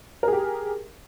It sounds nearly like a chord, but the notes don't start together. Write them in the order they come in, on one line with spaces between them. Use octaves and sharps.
A#4 G#4 G4